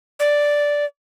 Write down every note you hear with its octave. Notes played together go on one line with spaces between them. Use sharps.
D5